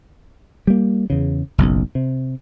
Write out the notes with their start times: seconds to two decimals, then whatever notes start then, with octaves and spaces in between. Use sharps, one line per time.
0.67 G3 A#3
1.10 E2 C#3
1.58 F#1 B1
1.95 C3